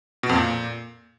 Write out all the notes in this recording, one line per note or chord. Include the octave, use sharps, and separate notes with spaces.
B2
F2
A#2